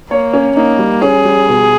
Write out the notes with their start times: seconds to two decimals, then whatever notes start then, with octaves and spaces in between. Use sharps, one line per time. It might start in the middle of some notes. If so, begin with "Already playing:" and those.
0.10 A#3 C#5
0.33 C#4
0.56 A#3 D#4
0.79 G3
1.02 C#4 G#4
1.25 G3
1.48 B2